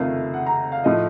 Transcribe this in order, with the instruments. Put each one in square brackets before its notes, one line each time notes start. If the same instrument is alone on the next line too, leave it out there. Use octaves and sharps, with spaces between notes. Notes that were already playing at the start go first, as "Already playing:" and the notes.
Already playing: [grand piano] F#1 F2 C3 D#3 A3 F5
F#5
A#5
F5
A2 F3 A3 D#4 D#5